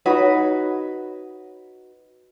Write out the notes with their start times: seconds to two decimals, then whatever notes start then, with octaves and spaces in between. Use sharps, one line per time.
0.06 D#4 F#4 B4 C#5